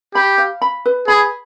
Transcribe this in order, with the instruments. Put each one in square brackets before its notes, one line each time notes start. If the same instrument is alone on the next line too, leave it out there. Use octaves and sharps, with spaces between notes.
[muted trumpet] G4 [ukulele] B5
[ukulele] F5
B5
B4
[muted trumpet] G#4 [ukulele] B5